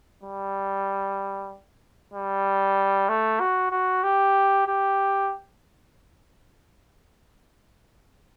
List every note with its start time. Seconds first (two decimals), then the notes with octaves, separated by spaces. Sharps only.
0.23 G3
2.13 G3
3.09 A3
3.40 F#4
3.71 F#4
4.03 G4
4.67 G4